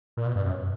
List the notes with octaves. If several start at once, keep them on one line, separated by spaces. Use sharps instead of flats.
A#2
B2
G2
F#2